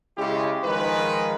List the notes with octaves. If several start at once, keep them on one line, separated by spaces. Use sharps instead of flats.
C#3 G#3 E4 G4
D#3 F3 G#3 B4